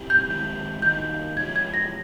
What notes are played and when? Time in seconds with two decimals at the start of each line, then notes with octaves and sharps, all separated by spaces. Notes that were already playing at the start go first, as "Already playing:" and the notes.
Already playing: A#2 G3 C4 E4 G4
0.10 G6
0.28 D#3 G#3 C4 E4 G4
0.82 D#3 G3 A#3 D#4 F#4 G6
1.37 F3 G#3 C#4 E4 G4 G#6
1.56 G#6
1.74 A#6